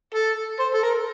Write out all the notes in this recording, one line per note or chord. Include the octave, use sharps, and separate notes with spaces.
A4
C5
A4
A#4